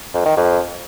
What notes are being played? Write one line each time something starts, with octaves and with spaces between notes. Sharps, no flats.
F2
D#3
F2